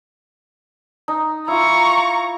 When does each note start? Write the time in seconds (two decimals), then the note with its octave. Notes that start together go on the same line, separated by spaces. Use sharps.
1.08 D#4
1.48 E4 F4 A#5 C#6